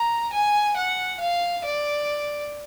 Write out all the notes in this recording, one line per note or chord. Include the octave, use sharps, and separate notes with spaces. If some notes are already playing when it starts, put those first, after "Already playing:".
Already playing: A#5
G#5
F#5
F5
D5